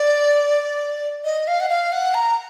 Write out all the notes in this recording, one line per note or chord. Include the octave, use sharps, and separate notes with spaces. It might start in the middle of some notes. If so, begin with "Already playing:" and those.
Already playing: D5
D#5
F5
F#5
F5
F#5
A#5